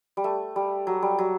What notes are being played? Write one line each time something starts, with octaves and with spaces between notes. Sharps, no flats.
G3
A3
G3
F#3
G3
F#3